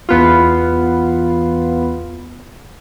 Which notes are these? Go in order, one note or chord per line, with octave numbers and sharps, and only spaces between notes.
E2 B3 F4